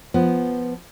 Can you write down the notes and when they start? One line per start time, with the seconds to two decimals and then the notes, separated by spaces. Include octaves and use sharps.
0.14 F3 B3